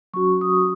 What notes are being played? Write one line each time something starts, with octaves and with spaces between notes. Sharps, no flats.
F#3 C#4 F#4 C#6
D#6